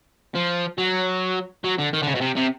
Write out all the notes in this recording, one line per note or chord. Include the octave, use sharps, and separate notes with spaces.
F3
F#3
F#3
D3
D#3
D3
C#3
B2
C3
C3